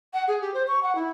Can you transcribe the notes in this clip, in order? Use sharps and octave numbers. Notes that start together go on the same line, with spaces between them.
F#5
G#4
G4
C5
C#6
F#5
E4